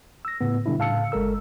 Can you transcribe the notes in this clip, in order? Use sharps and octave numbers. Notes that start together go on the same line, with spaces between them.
E6 A#6
A2 C#3 B3
B2 D3 G3 D4 E4
A2 C#3 F5 A5 E6 C#7
G1 G#3 A4 A#4 E6